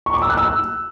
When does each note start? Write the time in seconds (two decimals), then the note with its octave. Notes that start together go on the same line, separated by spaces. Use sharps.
0.06 C#6
0.14 D6
0.22 E6
0.30 F#6
0.37 E6